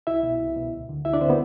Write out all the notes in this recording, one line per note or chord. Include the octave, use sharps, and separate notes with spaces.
C2 E4 E5
B2
C2
B2
D2
D3
D2 E4 E5
D4 D5
D3 C4 C5
B3